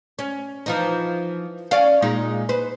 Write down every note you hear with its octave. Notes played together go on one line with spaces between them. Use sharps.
C#4
E3 F3 D#4
C#4 D5 F5
A#2 G#3 D#4
B4 C5